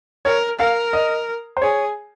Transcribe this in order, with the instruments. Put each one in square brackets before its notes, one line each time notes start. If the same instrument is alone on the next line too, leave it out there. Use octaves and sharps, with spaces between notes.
[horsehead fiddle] A#4 [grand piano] C#5
[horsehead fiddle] A#4 [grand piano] F5
[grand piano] D#5
C5
[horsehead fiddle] G#4 [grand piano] C#5